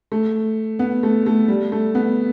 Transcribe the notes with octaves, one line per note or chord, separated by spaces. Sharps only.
A3
B3
A3
A3
G3
A3
B3